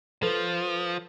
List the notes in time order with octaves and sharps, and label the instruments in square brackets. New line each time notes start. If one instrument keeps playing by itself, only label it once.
[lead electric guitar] F3 [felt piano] A4 B4